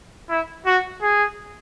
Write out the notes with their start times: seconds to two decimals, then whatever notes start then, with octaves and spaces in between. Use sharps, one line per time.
0.30 E4
0.66 F#4
1.03 G#4